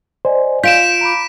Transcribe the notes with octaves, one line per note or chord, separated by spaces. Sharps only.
C5 D5 D#5 G#5
F4 G6 B6 D7 E7
A#5 B5 D6